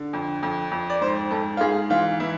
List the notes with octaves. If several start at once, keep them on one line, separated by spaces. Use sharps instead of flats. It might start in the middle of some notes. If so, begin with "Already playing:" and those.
Already playing: D3
F2
F2
F2
D5
G#2 C5
G#2 A4
F4
G#2 G#4
E3 F4
E3 E4